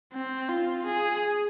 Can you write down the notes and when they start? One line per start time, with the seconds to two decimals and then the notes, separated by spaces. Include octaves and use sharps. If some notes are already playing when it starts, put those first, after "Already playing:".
0.13 C4
0.49 F4
0.86 G#4